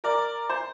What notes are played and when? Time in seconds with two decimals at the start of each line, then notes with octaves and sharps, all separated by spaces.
0.04 A#4 D5
0.49 C5